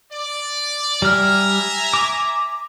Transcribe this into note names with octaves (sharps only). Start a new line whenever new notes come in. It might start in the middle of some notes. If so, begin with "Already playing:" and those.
D5
G3 E5 G#5 A#5 F6
D6